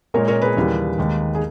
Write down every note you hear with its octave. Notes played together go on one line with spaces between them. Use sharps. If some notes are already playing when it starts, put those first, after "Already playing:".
A#2 G#3 A#4 C#5
A#4 C#5
G#4 B4
D#2 C#3 E3 G3
D#2 D#3 G#3
G#4